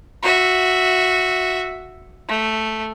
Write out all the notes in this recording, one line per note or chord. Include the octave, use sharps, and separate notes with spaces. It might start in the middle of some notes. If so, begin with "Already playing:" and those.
F#4 E5
A3